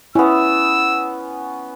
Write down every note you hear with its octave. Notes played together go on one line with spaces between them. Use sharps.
B3 C#4 E4 E6